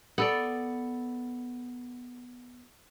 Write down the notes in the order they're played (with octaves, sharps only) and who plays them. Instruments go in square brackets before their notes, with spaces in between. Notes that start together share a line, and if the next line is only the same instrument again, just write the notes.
[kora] B3 A4 D5